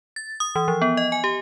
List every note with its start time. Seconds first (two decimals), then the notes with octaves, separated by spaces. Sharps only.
0.16 A6
0.40 D#6
0.56 E3
0.68 F3
0.82 B3
0.97 D#5
1.12 G#5
1.24 G4